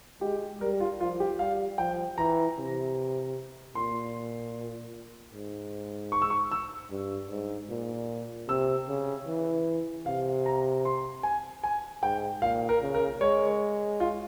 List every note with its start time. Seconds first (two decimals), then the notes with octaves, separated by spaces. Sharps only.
0.21 G#3 G4
0.61 G3 A#4
0.80 F4
1.00 F3 F4
1.20 G4
1.39 G3 F5
1.78 F3 G5
2.18 E3 A#5
2.57 C3
3.75 A#2 C6
5.33 G#2
6.12 C#6
6.22 E6
6.30 C#6
6.52 E6
6.91 G2
7.30 G#2
7.69 A#2
8.48 C3 E6
8.88 C#3
9.27 E3
10.06 C3 F5
10.46 A#5
10.85 C6
11.23 G#5
11.64 G#5
12.02 G#2 G5
12.42 A#2 F5
12.69 A#4
12.81 C#3
12.95 A#4
13.21 G#3 C#5
14.00 F4